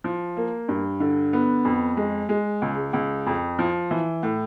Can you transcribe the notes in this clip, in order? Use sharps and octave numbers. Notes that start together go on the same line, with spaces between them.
F3
A#3
G2
D3
B3
F2
G#3
G#3
C#2
C#2
F2
F3
E3
A2